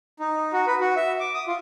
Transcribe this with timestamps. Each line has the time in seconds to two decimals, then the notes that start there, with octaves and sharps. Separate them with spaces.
0.20 D#4
0.53 F#4
0.67 B4
0.80 F#4
0.96 E5
1.20 D6
1.34 D#6
1.47 F4